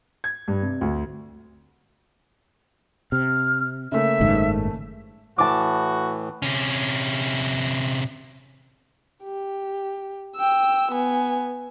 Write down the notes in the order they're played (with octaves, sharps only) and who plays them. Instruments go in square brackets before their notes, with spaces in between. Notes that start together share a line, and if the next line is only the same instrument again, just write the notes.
[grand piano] G#6
G2
C3
D2
[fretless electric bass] C3 [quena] F6
[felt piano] C#3 A3 A#3 [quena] E5
[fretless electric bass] F#1 G#2 D#3
[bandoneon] A2 E3 [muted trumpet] F#4 [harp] A5 D6
[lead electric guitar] C3 C#4
[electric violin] G4
G5 E6
B3 G#5